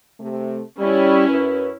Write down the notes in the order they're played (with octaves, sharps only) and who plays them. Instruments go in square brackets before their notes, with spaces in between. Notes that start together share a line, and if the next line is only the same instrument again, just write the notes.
[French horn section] C3 A3
[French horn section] G3 [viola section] C#4 E4
[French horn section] F#2 B4